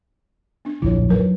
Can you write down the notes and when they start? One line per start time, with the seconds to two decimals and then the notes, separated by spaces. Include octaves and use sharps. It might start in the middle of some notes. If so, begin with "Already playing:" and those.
0.65 B3 D4
0.82 D1 A#1 F2 E4 F4 C#5
1.09 F#3 D#4 A#4 B4